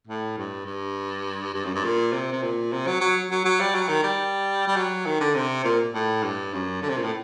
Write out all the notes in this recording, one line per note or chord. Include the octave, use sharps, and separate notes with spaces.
A2
G2
G2
G2
F#2
G2
A#2
C3
C3
A#2
C3
F#3
F#3
F#3
F#3
G3
F#3
D#3
G3
G3
F#3
D#3
D3
C3
A#2
A2
G2
F#2
D3
C3
A#2
A2